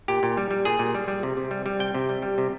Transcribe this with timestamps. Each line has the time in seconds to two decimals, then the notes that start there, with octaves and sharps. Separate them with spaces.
0.08 A#2 G4
0.23 A#2
0.37 G3
0.51 G3
0.65 A#2 G#4
0.79 A#2
0.95 G3
1.08 G3
1.23 C3
1.37 C3
1.51 G3
1.66 G3
1.79 C3 G5
1.95 C3
2.09 G3
2.22 G3
2.38 C3